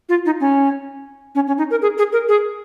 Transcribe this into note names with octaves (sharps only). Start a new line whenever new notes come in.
F4
D#4
C#4
C#4
C#4
D#4
A#4
G#4
G#4
A#4
G#4